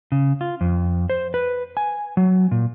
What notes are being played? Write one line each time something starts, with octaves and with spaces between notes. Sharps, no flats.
C#3
F4
F2
C5
B4
G#5
F#3
A#2